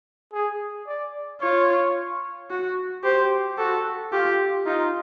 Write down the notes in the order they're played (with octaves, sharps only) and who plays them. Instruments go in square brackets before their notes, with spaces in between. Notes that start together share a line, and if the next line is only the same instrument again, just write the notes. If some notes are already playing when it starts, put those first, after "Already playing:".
[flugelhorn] G#4
D5
[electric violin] F4 [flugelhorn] C#5
[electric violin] F#4
[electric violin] G4 [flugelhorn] C5
[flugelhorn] F#4 [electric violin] A4
[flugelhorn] F4 [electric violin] G4
[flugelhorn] D#4 [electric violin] F4